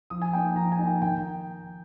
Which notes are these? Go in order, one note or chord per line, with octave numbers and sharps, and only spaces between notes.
F3 D#6
G#5
A#3 D#4 G5
F3 A#5
G#5
A#3 D#4
G5
D#3 G5